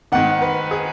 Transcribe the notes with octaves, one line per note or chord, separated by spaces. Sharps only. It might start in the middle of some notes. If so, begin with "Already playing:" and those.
G#2 D#3 F#5
B4
G#4